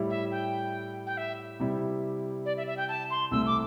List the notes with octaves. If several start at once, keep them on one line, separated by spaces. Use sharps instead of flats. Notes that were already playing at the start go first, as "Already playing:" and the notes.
Already playing: A2 G3 E4
E5
G5
G5
E5
C3 G3 E4 G4
D5
E5
E5
G5
A5
C6
C2 C3 A3 E6
D6